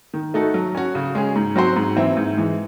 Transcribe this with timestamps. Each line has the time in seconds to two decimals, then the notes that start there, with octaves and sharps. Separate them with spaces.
0.14 D#3
0.34 A3 D#4 F#4 A4
0.54 F#3
0.75 C#4 F#4
0.95 C#3
1.15 G#3 C#4 G#4
1.36 G#2
1.56 F#3 C4 F#4 C5
1.76 G#2
1.96 E3 C4 E4
2.17 G#2
2.37 E3 G#3